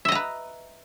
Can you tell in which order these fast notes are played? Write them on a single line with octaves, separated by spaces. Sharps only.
E5 D#5 A#5 B4